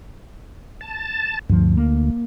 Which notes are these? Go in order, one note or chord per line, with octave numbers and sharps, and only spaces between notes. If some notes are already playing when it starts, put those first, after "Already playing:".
A5
D2 G2 F3
A#3